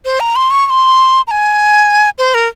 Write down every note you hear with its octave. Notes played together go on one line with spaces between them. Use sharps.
C5
A#5
C6
C#6
C#6
C6
A#5
G#5
C5
A#4